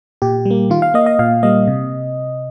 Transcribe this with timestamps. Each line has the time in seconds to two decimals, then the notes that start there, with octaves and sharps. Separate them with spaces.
0.22 A#2 G4
0.45 G3
0.50 A#3
0.70 D#3 F4
0.82 F5
0.94 A#3 D#5
1.06 D#5
1.19 A#2 F5
1.43 G3 A#3 D#5
1.67 C3